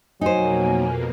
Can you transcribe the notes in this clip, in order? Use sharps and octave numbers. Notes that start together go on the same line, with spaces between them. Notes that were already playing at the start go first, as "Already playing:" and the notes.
F2 B2 F#3 A#3 D#4 C5 G#5